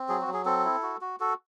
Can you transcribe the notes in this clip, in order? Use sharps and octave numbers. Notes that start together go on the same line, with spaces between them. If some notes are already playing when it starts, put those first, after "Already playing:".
Already playing: C4
F#3 G#4
F#4
F#3
G#4
C4 A4
E4
F#4
F#4
F#4 A4